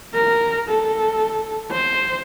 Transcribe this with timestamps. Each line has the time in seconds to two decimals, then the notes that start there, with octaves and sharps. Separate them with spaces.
0.14 A#4
0.70 A4
1.71 C5